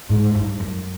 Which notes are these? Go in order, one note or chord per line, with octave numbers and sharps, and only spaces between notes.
G#2
G2
F#2